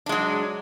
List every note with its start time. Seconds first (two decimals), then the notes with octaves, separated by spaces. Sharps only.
0.06 D4
0.09 G#3
0.12 F#3